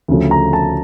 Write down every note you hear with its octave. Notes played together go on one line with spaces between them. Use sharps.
D2 C#3 F3 A3
A#5
A5